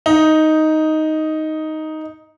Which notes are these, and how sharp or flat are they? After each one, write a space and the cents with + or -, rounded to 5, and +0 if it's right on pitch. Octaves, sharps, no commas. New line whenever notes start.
D#4 +5